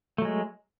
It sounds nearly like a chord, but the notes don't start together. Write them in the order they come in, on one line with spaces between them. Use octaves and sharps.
A3 F#3 G#3